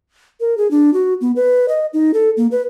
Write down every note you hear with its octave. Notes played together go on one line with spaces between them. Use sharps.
A#4
G#4
D4
F#4
B3
B4
D#5
D#4
A4
A#3
B4